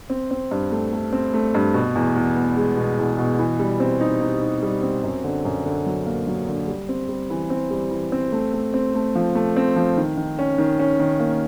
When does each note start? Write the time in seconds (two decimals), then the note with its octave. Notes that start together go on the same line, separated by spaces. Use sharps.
0.10 C4
0.31 C4
0.51 G2
0.72 A3
0.93 A3
1.13 C4
1.34 A3
1.55 G2
1.74 B2
1.95 E2
2.16 E2
2.36 B3
2.57 G#3
2.77 B2
2.98 E2
3.18 B2
3.39 E3
3.59 G3
3.80 C4
4.01 D#4
4.21 D#4
4.42 D#4
4.63 G3
4.83 C4
5.03 F#2
5.24 D3
5.45 F#2
5.66 D3
5.86 F#3
6.06 A#3
6.27 F#3
6.48 D3
6.68 G3
6.89 C4
7.09 G3
7.30 E3
7.50 C4
7.71 G3
7.91 E3
8.12 C4
8.32 A3
8.53 A3
8.74 C4
8.94 A3
9.15 F3
9.35 A3
9.57 C4
9.76 F3
9.97 D#3
10.17 D#3
10.39 C#4
10.58 D#3
10.79 C#4
11.00 D#3
11.20 A#3